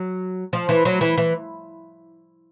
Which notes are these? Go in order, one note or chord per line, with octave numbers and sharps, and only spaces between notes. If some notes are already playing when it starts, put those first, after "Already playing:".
Already playing: F#3
F3
E3
F#3
E3
E3